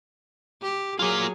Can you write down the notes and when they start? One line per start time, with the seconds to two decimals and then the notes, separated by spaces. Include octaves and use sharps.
0.62 G4
0.99 F#3 A#3 F4 G#4